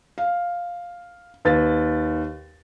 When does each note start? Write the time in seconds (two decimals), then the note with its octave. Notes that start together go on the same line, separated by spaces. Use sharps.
0.18 F5
1.45 D#2 B4 A6